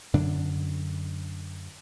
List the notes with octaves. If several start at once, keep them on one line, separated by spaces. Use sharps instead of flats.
F#2 D3 D4